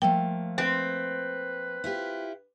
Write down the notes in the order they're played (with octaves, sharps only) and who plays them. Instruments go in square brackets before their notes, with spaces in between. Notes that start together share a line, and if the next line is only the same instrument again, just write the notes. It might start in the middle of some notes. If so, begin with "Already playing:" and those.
[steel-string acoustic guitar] F3 A3 A#3 [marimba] G5
[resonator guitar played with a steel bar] C4 [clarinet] B4
[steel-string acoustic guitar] E4 F4 G4